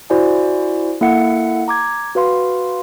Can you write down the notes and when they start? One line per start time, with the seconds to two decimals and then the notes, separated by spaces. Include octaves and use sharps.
0.10 E4 F#4 C5 D5 G#5
1.01 A#3 E4 A4 E5 F#5 C#7
1.68 A#5 D6 G#6
2.15 F#4 B4 F5 C6